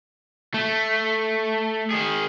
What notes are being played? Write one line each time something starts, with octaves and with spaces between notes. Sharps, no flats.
A3
D#3 G#4